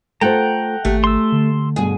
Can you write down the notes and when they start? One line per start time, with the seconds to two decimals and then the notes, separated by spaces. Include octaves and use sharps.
0.21 A3 F4 A4 C5 F#5 G5 A#5
0.85 G#1 A3 G4 G#5
1.04 C6 E6
1.32 D3
1.76 G2 B2 D3 G#4